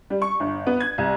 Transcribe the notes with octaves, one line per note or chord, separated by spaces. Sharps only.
G3
C#6
G1
B3
G#6
C2